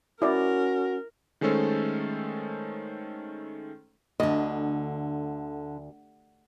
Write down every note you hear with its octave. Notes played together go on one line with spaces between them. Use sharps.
C#4 E4 F#4 A#4 D5
D#3 G#3 A3 C#4 A4 C5
D2 D3 D#5